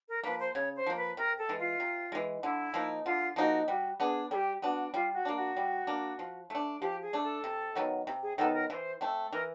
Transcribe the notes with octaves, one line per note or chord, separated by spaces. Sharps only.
A#4
F3 A#3 B4
C5
C#3 C#5
C5
F3 A#3
B4
C3 A#4
A4
E3 G#3
F4
C3
E3 G#3
D3 E4
F3 A#3 D#4
D3 F4
F3 A#3 D#4 F#4
G3 F#4
B3 D4 G#4
G3 G4 A4
B3 D4 F#4
G3 F4
F#4
A#3 D4
F#4
G3
A#3 D4
F3
A3 D4
F3 G4
G#4
A3 D4
A4
C3
D#3 F#3 B3
C3
G#4
D#3 F#3 B3 A4
A#4
E3 C5 E5
A3 C4
E3 A#4